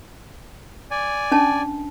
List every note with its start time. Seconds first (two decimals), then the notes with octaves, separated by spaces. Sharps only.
0.91 D5 G#5
1.32 C#4 D4 A5